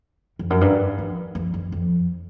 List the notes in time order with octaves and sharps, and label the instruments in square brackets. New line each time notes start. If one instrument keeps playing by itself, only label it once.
[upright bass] F2
F#2
G2
F2
F2
F2
F2